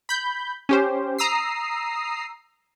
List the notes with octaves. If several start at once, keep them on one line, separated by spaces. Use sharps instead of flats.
B5 G6
C#4 G4 C5
A#5 D#6 E6 C7